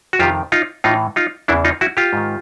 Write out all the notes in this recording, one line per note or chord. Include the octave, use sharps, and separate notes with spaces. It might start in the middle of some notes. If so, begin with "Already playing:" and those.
F#4
F2 C3 D#3 F4 G4
D#4 F4
A2 E3 D#4 F4
D#4 F4
E2 C#3 E3 D4 E4
D#4 F4
E4 F#4
F4 G4
G#2 D#3